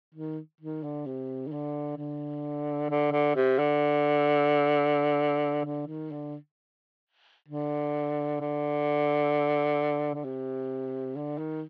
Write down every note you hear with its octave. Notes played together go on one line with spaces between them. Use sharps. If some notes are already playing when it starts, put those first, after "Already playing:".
D#3
D#3
D3
C3
D#3
D3
D3
D3
D3
C3
D3
D3
D#3
D3
D3
D3
D3
C3
D3
D#3